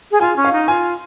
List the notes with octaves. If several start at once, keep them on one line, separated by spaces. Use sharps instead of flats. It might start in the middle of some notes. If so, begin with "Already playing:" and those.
G#4
F4 G#5
C#4
F5
D#4
F4 G#5